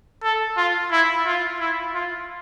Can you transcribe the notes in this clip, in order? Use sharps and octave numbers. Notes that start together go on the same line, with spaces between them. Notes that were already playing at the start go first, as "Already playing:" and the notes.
A4
F4
E4
F4
E4
F4